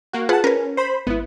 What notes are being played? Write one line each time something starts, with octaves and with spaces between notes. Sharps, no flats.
A#3 F#4
F4 G#4 B4 F#5 A5
C#4 A#4 B4
C5 B5
G#1 B3 E4